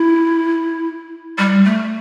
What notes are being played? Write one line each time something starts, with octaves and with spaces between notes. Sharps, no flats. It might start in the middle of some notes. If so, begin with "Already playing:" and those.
Already playing: E4
G3
A3